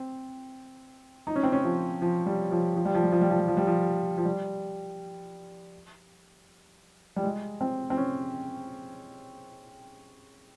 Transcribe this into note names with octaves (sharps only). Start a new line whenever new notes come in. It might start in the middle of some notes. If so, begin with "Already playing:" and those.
Already playing: C4
D#4
C#4
C4
C#4
F3
F3
G3
F3
F3
G3
F3
G3
F3
G3
F3
G3
F3
G3
F3
F3
G3
G3
G#3
C4
C4
C#4